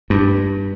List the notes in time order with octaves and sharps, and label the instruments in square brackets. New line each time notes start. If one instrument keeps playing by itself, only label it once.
[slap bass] G2